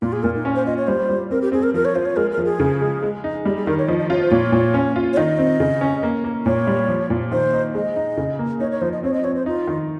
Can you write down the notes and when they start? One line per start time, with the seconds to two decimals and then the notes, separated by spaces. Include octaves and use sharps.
0.02 A#2 F4
0.13 G#4
0.23 A#2 A#4
0.35 D#4
0.45 C#4
0.55 C5
0.66 F4 D#5
0.77 C#5
0.87 G3 C5
1.09 G3
1.31 C4 A#4
1.42 G4
1.52 C4 G#4
1.63 A#4
1.74 F3 A#4
1.85 C#5
1.95 F4 C5
2.06 C#5
2.16 G#3 A#4
2.31 A#4
2.38 F3
2.45 G#4
2.60 C#3
2.81 G#3
3.03 G#3
3.24 D#4
3.45 G3 G4
3.56 G#4
3.67 D#3 A#4
3.78 C#5
3.88 F3 D#5
3.99 D#5
4.10 F4 C#5
4.22 C5
4.31 A#2 C#5
4.52 A#2
4.74 C#4
4.96 F4
5.13 C#5
5.17 D#3 D#5
5.39 C4
5.60 C#3
5.81 C#4
6.03 A#3
6.24 A#3
6.46 A#2 C#5
6.67 G3
6.89 F3
7.10 A#2
7.32 D#3 C5
7.53 D#4
7.75 G#3 D#5
7.96 D#4
8.17 C#3
8.39 A#3
8.60 D#4 C#5
8.71 C#5
8.81 F3 C5
8.92 D#5
9.03 C4 C#5
9.13 D#5
9.24 C4 C#5
9.35 C5
9.46 D#4 F4
9.67 D#3